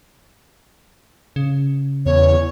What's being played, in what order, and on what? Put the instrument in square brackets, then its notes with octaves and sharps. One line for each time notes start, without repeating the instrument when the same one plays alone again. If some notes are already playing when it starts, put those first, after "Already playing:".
[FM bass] C#3
[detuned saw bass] E2 [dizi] C#5